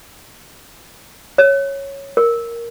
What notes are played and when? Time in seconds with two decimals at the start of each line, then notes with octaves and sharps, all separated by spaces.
1.38 C#5
2.17 A#4